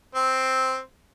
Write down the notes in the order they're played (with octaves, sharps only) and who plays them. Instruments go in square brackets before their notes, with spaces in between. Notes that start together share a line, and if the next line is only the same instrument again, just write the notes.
[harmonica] C4